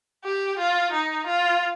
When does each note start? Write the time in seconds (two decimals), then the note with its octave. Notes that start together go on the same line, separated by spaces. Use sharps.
0.24 G4
0.59 F4
0.92 D#4
1.27 F4